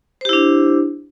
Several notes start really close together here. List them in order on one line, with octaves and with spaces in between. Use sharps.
C5 G4 E4 D4